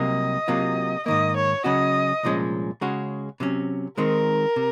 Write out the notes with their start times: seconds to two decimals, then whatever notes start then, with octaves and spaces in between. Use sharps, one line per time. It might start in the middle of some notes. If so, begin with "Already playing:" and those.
Already playing: C2 C3 F#3 A#3 D#5
0.48 C3 F#3 A#3 F4
1.06 G#2 D#3 A#3 D#5
1.36 C#5
1.64 C#3 F#3 C#4 F#4 D#5
2.23 C2 A#2 F3 G#3 C#4
2.81 C#3 G#3 C#4 F#4
3.40 C3 F#3 C#4
3.98 D#3 G#3 C4 D#4 A#4
4.56 C3